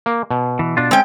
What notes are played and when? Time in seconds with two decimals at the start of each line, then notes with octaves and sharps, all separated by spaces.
0.06 A#3
0.31 B2
0.59 E3
0.77 B2 D4 F4
0.91 G#3 C4 C#4 G5